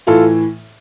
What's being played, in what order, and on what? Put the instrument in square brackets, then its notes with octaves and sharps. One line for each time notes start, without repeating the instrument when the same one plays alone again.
[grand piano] A2 E3 F4 A4